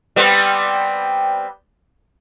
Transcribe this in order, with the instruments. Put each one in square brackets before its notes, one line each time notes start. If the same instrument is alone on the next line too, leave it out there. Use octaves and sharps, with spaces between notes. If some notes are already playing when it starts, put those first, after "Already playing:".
[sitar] G3 B3 C4